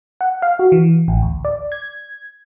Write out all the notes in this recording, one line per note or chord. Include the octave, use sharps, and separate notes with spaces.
F#5
F5
F#4
E3
A1
D2
D5
G#6